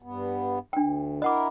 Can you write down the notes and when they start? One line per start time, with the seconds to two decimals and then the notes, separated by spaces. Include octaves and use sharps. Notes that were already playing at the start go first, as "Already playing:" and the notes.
0.02 G2 B3
0.73 D2 D4 G5
1.22 E4 A#4 D#5 F#5 D6